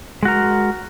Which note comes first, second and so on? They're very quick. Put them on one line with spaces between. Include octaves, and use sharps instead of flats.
G#3 F#4 A#4